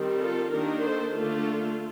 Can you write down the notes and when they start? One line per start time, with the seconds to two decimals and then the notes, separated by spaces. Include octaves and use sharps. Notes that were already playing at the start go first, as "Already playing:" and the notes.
Already playing: D#3 G3 C4
0.19 F4 A4
0.51 D#3 A#3 D4 G4 A#4
0.83 A4 C5
1.15 D3 A3 D4 F4 A4